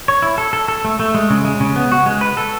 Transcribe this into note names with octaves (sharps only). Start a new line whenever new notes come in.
C#5
E4
A4
A4
A4
A3
A3
G#3
C#3
G#3
C#3
B3
F#4
G#3
B4
A4